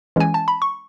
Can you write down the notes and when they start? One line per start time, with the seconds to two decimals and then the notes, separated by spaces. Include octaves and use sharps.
0.16 E3 G#3 C#4 G#5
0.34 A5
0.48 B5
0.62 C#6